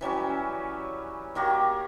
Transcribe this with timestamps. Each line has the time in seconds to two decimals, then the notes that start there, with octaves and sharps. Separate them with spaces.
0.01 E3 F#3 G3 C#4
1.35 D#3 A#3 F#4 G4